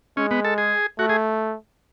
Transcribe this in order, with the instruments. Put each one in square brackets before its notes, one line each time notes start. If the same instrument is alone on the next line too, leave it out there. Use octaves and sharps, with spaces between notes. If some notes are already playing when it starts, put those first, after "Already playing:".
[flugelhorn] G#3 [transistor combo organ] C#4
[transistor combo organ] B3
A4
G#4
[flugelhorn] A3 [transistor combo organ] F#4
[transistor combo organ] G#4